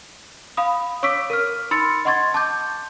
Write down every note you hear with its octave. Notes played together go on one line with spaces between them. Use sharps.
F5 B5 D#6
C#5 C#6 D6 E6 B6 D7
A#4 F6
D#4 B5 C6 E6 A6 C#7
D#5 F#5 C6 C#6 G#6 A6
A5 D6 G6